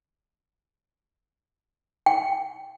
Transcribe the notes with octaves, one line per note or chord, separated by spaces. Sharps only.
G5